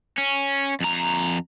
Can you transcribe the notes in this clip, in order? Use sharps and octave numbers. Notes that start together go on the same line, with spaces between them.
C#4
F2 A#5